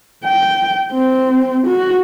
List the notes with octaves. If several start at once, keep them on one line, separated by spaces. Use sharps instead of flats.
G5
C4
F#4